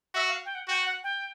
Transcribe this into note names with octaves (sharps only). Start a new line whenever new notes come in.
F#4 E5
F5
G5
F#5
F#4 G5
F#5
G5